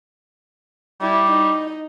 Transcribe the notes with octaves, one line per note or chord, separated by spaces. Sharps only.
G3 E4
D#4